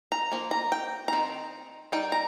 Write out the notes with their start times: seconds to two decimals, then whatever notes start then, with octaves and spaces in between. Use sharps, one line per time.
0.12 A#5
0.32 F3 A#3
0.51 A#5
0.72 G5
1.08 A#5
1.13 D#3 C4
1.92 G3 D#4 G5
2.12 A#5